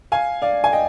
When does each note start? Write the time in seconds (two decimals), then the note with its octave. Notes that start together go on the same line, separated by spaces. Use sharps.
0.12 F5 G#5
0.42 D5 F5
0.64 G#5
0.73 D#5 G5